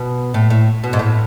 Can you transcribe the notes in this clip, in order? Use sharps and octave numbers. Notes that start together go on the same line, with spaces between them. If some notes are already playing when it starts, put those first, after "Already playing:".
Already playing: B2
A2
A2
B2
G#2
A2